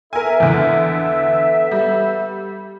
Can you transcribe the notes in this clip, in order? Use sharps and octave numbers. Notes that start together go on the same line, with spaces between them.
B3 A4 A#4 E5 G#5
E2 D3
G3